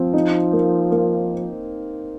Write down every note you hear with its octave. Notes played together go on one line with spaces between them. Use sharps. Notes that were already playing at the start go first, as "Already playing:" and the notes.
Already playing: F3 C4
D#4
A#3
A#3